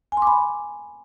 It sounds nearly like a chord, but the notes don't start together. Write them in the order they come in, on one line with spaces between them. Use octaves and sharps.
G#5 C6 D6 B5